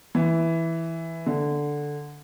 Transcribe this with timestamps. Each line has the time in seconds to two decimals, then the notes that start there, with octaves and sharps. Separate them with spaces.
0.15 E3
1.26 D3